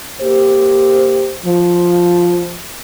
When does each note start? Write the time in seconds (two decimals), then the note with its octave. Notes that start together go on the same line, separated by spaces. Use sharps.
0.22 A#3 G4 C5
1.46 F3